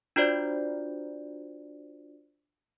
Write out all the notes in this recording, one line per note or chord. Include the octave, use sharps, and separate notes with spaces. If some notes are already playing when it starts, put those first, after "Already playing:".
D4 F4 F#4 C5 D5